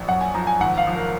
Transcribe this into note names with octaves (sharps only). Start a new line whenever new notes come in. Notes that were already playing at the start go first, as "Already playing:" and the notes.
Already playing: A#1
F#2 F#5
G#5
F3 A#5
G#5
G#1 F#5
F5
F3
A#4